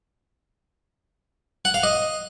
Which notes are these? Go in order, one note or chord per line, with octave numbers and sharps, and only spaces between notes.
F#5
F5
D#5